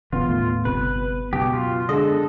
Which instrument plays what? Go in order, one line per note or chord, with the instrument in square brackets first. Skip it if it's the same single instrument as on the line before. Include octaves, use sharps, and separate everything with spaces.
[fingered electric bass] E1 A1 C#3 [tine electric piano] B3 [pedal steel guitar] F4
[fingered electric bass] D#2 A2
[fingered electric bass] G1 C3 [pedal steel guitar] B4
[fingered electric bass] C#2 F#2 [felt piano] B2 [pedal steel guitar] G4
[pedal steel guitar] F4
[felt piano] D3 G#3 [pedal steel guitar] A4 D#5